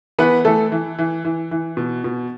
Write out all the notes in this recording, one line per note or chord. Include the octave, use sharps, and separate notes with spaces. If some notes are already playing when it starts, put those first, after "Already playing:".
E3 B3 B4
E3 A3 A4
E3
E3
E3
E3
B2
B2